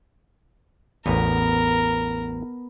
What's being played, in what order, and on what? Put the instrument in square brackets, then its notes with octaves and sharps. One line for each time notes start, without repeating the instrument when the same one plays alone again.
[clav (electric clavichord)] A1 E2 [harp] B3 [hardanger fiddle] A#4